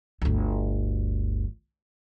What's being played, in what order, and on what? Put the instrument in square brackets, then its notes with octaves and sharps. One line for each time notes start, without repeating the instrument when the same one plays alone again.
[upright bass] G1 D2